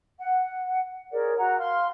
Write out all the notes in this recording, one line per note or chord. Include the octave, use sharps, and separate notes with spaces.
F#5
G#4 A#4 C#5 D5
F#4 F#5 A#5
F5 C6 F6